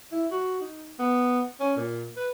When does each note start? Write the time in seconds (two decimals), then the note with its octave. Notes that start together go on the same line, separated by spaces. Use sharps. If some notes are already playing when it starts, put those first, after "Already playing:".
0.12 E4
0.31 F#4
0.61 D#4
0.99 B3
1.60 C#4
1.77 A#2
2.17 B4